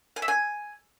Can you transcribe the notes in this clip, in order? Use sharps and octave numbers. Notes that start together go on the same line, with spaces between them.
G#5
E5
G#5